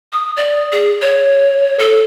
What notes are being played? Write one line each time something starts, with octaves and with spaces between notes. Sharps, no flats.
D#6
D5
G#4
C#5
A4